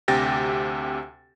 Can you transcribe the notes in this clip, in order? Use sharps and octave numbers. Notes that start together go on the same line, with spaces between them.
D2 C3 G4 G5 A6 A#6